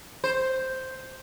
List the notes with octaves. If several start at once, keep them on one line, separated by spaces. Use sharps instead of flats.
C5